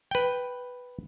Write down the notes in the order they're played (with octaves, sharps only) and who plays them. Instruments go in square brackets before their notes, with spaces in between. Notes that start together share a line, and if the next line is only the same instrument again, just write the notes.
[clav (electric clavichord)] B4 G5